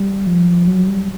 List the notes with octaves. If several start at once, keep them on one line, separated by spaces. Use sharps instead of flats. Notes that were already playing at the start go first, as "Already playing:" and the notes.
Already playing: G3
F3
F#3
G3